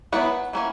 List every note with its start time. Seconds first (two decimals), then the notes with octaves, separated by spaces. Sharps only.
0.12 F#3 B3 E4 F#5
0.53 E3 A#3 C#4